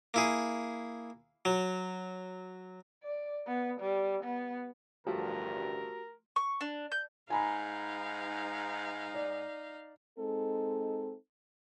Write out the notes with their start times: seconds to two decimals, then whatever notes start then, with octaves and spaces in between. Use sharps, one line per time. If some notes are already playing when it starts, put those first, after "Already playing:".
0.14 A#3 E4 G#4
1.45 F#3
3.03 D5
3.47 B3
3.80 G3
4.23 B3
5.07 A1 D2 G2 F3 A3 F#4 G4 A#4
6.36 C#6
6.61 D4
6.92 G6
7.30 G#2 D#4 F5 G#5 A#5 B5
9.14 D5
10.18 G#3 C4 D#4 A4